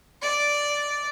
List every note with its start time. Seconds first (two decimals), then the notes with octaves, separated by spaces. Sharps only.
0.22 D5